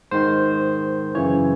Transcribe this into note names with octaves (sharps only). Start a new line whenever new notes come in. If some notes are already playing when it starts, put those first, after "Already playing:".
G#2 D#3 C5
F#2 C#3 E3 C#5